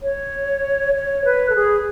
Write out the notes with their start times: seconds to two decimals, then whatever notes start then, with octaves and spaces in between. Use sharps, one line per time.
0.03 C#5
0.95 C#5
1.25 B4
1.50 A4
1.55 G#4